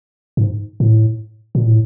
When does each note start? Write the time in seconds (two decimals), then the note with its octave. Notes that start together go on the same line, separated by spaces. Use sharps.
0.37 G#2
0.80 A2
1.55 A#2
1.67 A2